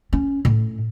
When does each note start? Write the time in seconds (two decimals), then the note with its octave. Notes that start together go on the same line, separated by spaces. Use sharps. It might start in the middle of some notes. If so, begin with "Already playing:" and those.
0.13 C#4
0.45 A2